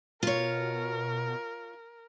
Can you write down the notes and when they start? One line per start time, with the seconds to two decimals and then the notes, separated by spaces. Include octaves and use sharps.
0.23 B2 F4 A#4 C#5